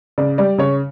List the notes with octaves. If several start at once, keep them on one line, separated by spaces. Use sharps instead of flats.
C#3 D5
G3 D5
C#3 C#5